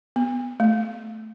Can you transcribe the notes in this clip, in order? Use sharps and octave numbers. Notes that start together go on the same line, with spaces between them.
B3
A3